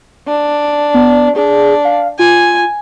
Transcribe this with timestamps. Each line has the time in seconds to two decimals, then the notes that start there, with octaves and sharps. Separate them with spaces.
0.28 D4
0.94 B3
1.36 D4 G#4
1.85 F5
2.19 F4 G#5